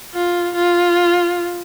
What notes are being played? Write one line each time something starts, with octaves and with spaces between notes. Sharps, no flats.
F4
F4